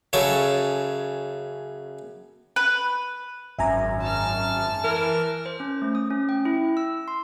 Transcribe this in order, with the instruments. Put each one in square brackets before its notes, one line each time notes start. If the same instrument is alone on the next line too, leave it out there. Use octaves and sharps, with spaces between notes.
[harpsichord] F#2 C#3 A4 C#5
[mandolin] B4
[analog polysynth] G#1 F#2 [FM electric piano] E5 G#5 A#5
[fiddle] A5 F6
[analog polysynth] E3 [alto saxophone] A#4
[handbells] C5
C#4
A3
D#6
C#4
G5
E4
E6
C6